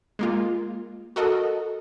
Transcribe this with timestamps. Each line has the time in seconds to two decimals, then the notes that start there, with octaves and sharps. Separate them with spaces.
0.19 G#3 A#3 F4
1.16 F#4 A4 A#4 D#5